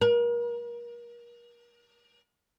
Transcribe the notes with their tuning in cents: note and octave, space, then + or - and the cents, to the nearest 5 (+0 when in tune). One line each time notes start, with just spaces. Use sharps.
A#4 +35